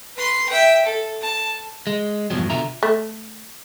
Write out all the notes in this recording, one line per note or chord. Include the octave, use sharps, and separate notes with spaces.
B4 C6
E5 G5
A4
A5
G#3
E2 G2 B2 F3 F#3
B2 D3 F4 E5 A#5
A3